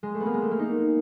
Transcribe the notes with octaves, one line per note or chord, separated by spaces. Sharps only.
G#3
A3
B3
A#3
G#3
A3
A#3
D#4